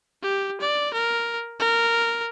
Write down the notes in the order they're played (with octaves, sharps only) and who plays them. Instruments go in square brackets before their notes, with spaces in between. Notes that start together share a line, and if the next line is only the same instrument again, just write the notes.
[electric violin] G4
D5
A#4
A#4